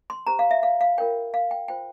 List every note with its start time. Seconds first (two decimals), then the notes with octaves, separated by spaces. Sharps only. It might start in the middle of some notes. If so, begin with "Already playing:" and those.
0.10 C6
0.27 G4 C5 A#5
0.39 F5
0.51 E5
0.63 F5
0.81 F5
0.98 F4 A#4 C#5 G5
1.34 F5
1.51 G5
1.68 F4 C5 G5